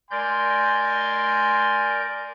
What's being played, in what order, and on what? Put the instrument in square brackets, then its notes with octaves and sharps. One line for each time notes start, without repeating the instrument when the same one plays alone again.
[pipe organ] A#4 D5 G6 [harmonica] G#5 C6